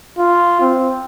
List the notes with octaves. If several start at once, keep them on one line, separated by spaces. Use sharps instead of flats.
F4
C4